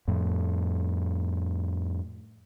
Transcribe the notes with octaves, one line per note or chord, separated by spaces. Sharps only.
F2 A2